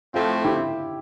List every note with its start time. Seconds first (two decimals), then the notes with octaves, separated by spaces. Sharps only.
0.14 A2 F3 A3 C4 F4
0.45 E4 G4